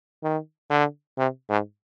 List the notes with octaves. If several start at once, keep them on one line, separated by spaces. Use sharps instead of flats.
D#3
D3
C3
G#2